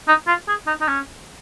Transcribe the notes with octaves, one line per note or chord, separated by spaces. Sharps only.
D#4
F4
G#4
D#4
D#4
C#4